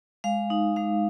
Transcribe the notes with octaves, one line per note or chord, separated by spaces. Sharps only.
G#3 F5
D#4
G#3 F5